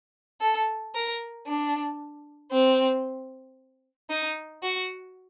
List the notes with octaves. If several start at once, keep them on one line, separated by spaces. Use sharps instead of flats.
A4
A#4
D4
C4
D#4
F#4